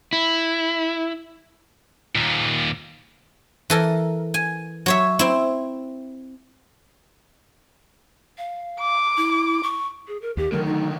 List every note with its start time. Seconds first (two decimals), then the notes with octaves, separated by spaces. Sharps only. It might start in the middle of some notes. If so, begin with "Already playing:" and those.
0.13 E4
2.15 D#2 A#2
3.70 E3 A4 A#4
4.34 G#5
4.86 F#3 C#5 E5
5.19 C4 E4
8.38 F5
8.80 D6
9.17 E4
9.63 C#6
10.08 G#4
10.22 A#4
10.37 D#2 G4
10.52 D3 D#3 F#3 A3 A#4
10.65 D#4